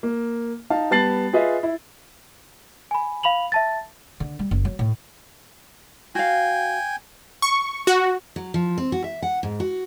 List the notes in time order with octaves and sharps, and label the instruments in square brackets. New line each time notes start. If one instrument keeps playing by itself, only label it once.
[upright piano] A#3
D#4 F5 A5
G3 B3 A5 A6 C7 F#7
F4 G#4 B4 D#5 E5
E4
[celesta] G#5 B5
F5 B5 F7 F#7
E5 A5 A6
[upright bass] D3
G3
F#1
F#3
A2
[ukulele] F#4 F5 [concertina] G5 G#5
[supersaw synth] C#6
F#4
[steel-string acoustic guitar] F#3
F3
C4
F#4
E5
F#5
G#2
F#4